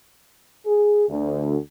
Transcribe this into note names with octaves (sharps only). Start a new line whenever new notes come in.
G#4
D2